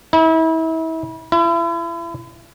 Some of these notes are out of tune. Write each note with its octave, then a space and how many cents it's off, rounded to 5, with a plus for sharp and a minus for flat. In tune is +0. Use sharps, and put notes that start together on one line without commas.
E4 -35
E4 +35